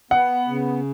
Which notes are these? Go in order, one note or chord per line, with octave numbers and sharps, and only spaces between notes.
B3 F#5
C#3